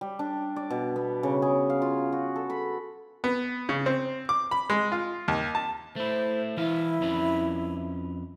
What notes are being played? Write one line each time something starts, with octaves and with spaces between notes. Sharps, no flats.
G3
D4
D5
B2
B3
C#3
G#4
F5
F4
F#4
A4
B5
B3
C#3
C4
D6
B5
G#3
F4
D#2
A5
A3 E4 C5
E3 E4 B4 F5
F2 C#4 B4